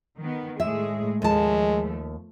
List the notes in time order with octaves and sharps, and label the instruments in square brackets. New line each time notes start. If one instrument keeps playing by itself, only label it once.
[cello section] D#3 B3
[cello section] A2 G#3 G#4 [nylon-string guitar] E5
[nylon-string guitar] D#2 A5 [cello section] F3 A3 [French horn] G#3